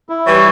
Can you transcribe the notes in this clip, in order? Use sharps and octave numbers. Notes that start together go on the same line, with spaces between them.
E4
E3 G3 C#5